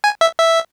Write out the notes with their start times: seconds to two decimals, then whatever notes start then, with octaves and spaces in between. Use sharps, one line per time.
0.04 G#5
0.21 E5
0.39 E5